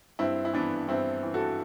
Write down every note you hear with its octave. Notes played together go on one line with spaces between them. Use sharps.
G2 C4 E4
E4
E3 B3 D4
G2 C4 E4
E3
F#4 A4